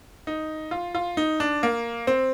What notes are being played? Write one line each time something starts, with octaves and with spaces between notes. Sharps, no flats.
D#4
F4
F4
D#4
D4
A#3
C4